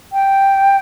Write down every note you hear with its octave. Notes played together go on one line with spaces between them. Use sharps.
G5